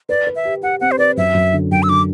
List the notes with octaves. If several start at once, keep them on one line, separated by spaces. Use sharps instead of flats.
B4 D5
B4
E5
G4
G4 F#5
C4 F#5
C5
B4 D5
F#2 E5
F#2
D3
F#2 G5
E6
D3 D6